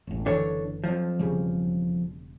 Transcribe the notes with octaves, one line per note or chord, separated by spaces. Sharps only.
E1 A1
F#1 D3 E3 D4 A4 C#5
F2 F3 F#3
E1 C#3 G3